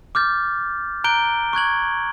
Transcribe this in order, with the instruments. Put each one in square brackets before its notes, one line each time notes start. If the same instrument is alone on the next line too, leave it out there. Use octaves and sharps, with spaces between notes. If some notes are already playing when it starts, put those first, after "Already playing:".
[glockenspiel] D6 F6 G6 A6
A#5 F#6 G6 D7 G7
C#6 F#6 G#6 F#7